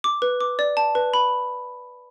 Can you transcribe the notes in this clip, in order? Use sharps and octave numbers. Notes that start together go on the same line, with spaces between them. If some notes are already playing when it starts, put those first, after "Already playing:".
D6
B4
D6
D5
A5
B4
B5